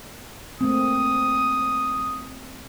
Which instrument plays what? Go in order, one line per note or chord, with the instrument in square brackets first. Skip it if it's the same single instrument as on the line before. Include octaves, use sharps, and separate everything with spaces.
[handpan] A3 A#3 C4 [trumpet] D#6